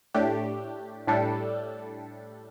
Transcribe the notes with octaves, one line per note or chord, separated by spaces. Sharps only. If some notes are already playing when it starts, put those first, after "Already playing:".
A2 A3 D4 G4
A2 G3 D4 A4